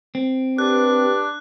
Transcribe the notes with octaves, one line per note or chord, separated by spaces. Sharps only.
C4
D4 G4 B4 F#6